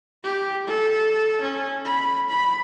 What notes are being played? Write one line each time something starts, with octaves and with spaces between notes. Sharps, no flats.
G4
A4
C#4
B5
B5